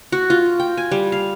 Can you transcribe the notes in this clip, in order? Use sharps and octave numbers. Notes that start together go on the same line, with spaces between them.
F#4
F4
G5
G#5
G3
F5